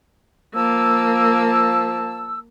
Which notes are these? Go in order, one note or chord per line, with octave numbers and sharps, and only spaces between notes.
F3 A#3 A5 E6